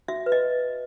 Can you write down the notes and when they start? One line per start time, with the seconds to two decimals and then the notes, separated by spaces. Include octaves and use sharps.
0.08 F#4 E5
0.26 B4
0.32 D#5